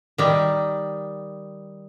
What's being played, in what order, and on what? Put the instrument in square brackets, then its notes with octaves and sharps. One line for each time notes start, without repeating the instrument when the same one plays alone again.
[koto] D#3 G3